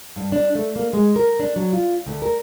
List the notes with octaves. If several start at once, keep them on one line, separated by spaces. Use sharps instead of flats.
G2
D4
A3
A#3
G#3
A#4
D4
F#3
F4
D2
A#4